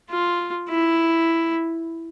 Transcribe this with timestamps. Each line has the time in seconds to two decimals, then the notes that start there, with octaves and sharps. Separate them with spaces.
0.10 F4
0.69 E4